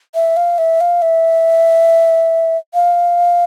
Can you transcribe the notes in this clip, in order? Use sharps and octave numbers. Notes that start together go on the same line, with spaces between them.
E5
F5
E5
F5
E5
F5